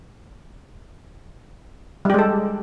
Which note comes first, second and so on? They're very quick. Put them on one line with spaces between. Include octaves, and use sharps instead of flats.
G3 G4 G#3 A4